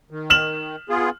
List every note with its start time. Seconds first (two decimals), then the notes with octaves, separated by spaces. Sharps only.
0.11 D#3
0.30 F6 E7 F#7
0.89 B3 F4 G#4